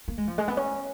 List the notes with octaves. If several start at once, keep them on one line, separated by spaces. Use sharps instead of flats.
A#3
G#3
F3
G#3
B3
C#4